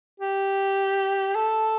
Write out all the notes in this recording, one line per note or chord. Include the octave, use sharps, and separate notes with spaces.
G4
A4